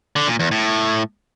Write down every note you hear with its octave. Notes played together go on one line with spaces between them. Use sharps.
D3
A#2
E2
A2